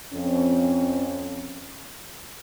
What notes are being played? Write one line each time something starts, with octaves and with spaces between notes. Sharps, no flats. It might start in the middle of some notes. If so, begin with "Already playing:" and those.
F2 C#4